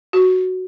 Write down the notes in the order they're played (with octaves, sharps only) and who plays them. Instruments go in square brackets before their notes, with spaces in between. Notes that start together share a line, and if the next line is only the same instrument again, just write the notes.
[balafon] F#4